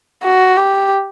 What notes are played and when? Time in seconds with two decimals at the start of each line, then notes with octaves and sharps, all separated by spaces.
0.24 F#4
0.57 G4